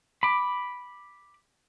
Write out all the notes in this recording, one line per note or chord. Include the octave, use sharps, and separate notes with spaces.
B5 D6